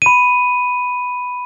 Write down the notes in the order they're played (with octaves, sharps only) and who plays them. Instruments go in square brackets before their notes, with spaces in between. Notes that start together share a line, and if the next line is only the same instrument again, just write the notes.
[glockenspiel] B5 D#7